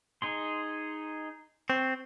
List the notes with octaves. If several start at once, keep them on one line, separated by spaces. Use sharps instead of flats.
D#4 G#4 C6
C4 C#6